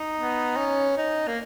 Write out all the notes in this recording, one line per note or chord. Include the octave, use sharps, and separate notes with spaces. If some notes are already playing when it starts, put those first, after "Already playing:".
Already playing: D#4
B3
C#4
D#4
A#3